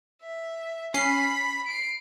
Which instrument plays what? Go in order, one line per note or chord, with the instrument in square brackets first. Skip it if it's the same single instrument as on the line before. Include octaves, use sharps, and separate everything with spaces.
[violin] E5
[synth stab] C#4 C7 [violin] B5 B6
[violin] C7 D7